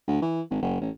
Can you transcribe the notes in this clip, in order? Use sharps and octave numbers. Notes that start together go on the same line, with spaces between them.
D2
E3
G#1
F#1
A1